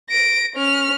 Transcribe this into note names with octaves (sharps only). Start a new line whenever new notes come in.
A#6 D7
C#4 F6